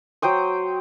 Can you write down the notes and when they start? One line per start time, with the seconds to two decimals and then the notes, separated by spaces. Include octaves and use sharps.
0.22 F#3 C5 G5 D#6